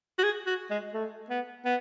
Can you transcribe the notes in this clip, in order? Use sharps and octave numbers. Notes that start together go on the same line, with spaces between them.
F#4
G#4
F#4
G#3
A3
B3
B3